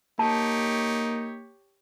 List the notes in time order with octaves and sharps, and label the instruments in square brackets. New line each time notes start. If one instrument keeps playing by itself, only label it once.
[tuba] A#3 [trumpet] D#4 [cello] G4 C#5 [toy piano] A5